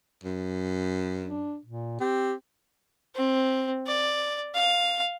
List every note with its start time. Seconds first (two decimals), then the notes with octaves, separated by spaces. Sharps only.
0.24 F#2
1.22 D4
1.66 A#2
2.00 C4 G4
3.15 C4
3.87 D5
4.55 F5